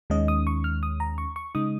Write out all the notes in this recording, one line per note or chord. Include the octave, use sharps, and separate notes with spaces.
D#2 D#3 G#3 C#4 D#5
D#6
C#6
F6
D#6
A#5
C#6
C#6
C#3 G#3 D#4 D#6